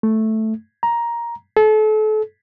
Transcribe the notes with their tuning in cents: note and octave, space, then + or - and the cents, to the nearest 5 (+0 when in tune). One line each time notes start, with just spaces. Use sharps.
A3 +0
A#5 +10
A4 -35